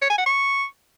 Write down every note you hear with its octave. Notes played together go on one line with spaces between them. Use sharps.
C#5
G#5
F#5
C#6